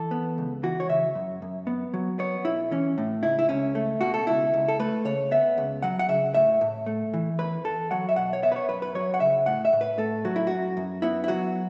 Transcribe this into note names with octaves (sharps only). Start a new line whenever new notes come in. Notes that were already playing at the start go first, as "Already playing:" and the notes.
Already playing: E3 A4
B3
C#2
E3 F#4
C#5
C#3 E5
F#2
F#2
B3
F#3
B3 C#5
B1 E4
E3 C#4
A2
C#2 E4
E4
C#2 C#4
A3
B2 F#4
A4
C#2 E4
C#2
A4
A3 B4
C#3 C#5
B3 E5
C#2
F#3 F#5
F#5
C#3 E5
A2 E5
A2
A3
E3
E2 B4
E2 A4
F#3 F#5
E5
B2 F#5
C#5
B3 E5
B4
C#5
F#2 B4
B4
F#3 C#5
F#5
C#3 E5
A2 F#5
E5
A2
B4
A3 A4
F#3 F#4
E4
F#2 F#4
F#2
B3 E4
E4
F#3 F#4